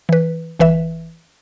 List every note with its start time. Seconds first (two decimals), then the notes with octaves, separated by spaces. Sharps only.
0.09 E3 B4
0.59 G1 E3 B4 E5